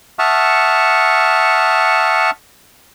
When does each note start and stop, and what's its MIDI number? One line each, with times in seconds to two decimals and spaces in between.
0.19 2.30 76
0.19 2.30 78
0.19 2.30 81
0.19 2.30 85
0.19 2.30 87
0.19 2.30 89